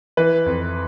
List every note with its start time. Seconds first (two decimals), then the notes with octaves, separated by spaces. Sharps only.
0.17 E3 B4
0.46 F2